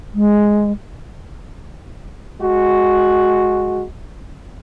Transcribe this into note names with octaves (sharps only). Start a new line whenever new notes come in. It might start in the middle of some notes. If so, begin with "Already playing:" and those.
G#3
G#3 F#4